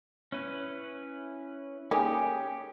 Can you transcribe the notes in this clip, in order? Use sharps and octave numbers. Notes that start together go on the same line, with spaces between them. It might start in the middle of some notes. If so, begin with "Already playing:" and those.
C#4 E4 B4
A#3 C#4 D#4 G4 G#4